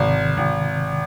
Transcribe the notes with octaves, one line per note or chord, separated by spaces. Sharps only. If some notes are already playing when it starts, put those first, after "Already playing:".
Already playing: G#1 C3 D#3
G#1